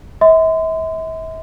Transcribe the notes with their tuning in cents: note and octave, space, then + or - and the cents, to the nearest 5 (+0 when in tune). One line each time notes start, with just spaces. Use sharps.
E5 -40 C6 -35